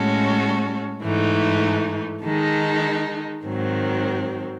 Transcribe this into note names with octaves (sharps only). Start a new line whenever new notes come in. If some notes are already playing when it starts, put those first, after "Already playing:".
Already playing: A2 G#3 C#4 F#4 A4
G#2 E3 A3 D#4
D#3 G#3 D#4 A4
G#2 D#3 F#3 C4